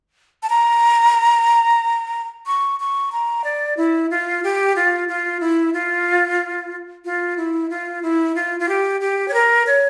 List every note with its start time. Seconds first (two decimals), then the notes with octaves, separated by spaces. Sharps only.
0.43 A5
0.50 A#5
2.46 C#6
2.80 C#6
3.12 A#5
3.44 D5
3.77 E4
4.11 F4
4.44 G4
4.76 F4
5.08 F4
5.41 E4
5.74 F4
7.05 F4
7.37 E4
7.70 F4
8.03 E4
8.36 F4
8.60 F4
8.69 G4
9.01 G4
9.28 C#5
9.34 A#4
9.67 C#5